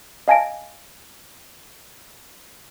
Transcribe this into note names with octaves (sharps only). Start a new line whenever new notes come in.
D#5 F5 G#5 A5 A#6 D7